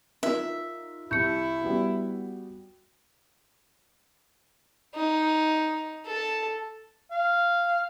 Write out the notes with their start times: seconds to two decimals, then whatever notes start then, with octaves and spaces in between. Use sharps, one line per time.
0.23 D#4 F4 A#4 E5
1.11 C2 E4 A5 C#6 G6 C#7
1.61 G3 B3 F#4
4.95 D#4
6.06 A4
7.11 F5